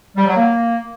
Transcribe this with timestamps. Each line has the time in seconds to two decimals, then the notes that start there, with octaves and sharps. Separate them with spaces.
0.16 G3
0.26 F#3
0.36 A#3